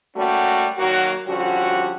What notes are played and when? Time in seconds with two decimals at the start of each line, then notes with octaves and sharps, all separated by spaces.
0.16 G3 A3 A#3 C#4 F#4
0.77 D#3 F#3 A#3 F#4
1.26 D3 F3 G3 C#4 F#4